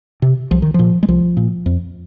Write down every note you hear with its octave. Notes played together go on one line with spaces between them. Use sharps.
C3
C2 F3
D#3
A#2 F3
G#3
C2 F3
A#2
F2